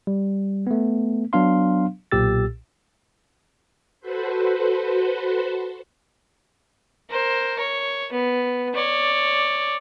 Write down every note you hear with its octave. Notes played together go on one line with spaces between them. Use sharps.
G3
A3 B3
F#3 B3 D4 F5 C6
B1 A#2 G4 E6 A6
F#4 A4 B4 C5
A#4 C5
C#5
B3
C#5 D5